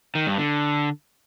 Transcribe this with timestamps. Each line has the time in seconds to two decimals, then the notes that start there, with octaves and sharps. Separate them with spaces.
0.15 D#3
0.27 G2
0.38 D3